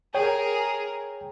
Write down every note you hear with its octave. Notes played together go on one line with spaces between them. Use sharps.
G#4 A#4 C#5 G5